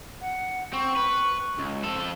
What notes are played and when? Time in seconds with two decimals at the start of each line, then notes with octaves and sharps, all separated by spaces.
0.21 F#5
0.73 C4 C#6
0.96 B4
1.59 C#2
1.83 F3 A4